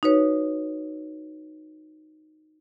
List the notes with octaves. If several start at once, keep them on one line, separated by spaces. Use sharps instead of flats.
D#4 F#4 B4 C#5